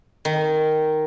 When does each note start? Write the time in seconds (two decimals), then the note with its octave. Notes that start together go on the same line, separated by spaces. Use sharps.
0.25 D#3